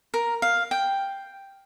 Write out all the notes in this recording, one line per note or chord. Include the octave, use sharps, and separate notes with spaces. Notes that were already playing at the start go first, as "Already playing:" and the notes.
A#4
F5
G5